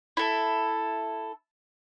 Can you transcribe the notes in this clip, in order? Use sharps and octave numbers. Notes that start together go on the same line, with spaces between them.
E4 A4